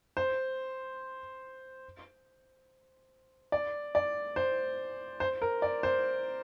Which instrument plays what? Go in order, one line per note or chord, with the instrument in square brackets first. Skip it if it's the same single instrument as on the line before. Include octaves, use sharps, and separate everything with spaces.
[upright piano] C5
D5
D5
C5
C5
A#4
D5
C5